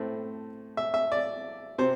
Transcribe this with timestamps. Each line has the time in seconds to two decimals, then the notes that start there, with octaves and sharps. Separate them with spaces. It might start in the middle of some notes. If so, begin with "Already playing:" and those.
Already playing: A2 A3 C4
0.77 E5
0.94 E5
1.12 D5
1.78 C3 C5